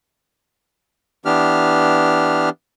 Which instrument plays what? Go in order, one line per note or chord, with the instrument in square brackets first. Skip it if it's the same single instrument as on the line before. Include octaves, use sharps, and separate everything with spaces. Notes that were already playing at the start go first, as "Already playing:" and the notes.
[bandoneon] E3 B3 D4 G4 F6